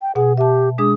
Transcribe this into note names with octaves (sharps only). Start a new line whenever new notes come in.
G5
B2 G#4 F#5
G4 E5 A5
G#3 D4 G#4 D#6